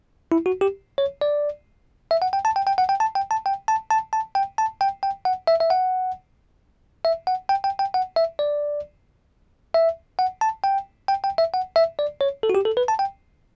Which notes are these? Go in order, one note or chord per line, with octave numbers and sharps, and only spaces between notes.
E4
F#4
G4
C#5
D5
E5
F#5
G5
A5
G5
G5
F#5
G5
A5
G5
A5
G5
A5
A5
A5
G5
A5
G5
G5
F#5
E5
E5
F#5
E5
F#5
G5
G5
G5
F#5
E5
D5
E5
F#5
A5
G5
G5
G5
E5
F#5
E5
D5
C#5
A4
F#4
G4
A4
B4
A5
G5